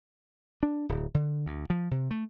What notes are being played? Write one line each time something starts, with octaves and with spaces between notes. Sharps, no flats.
D4
D1
D3
D2
F3
C3
A3